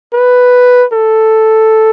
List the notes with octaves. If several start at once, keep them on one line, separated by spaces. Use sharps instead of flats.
B4
A4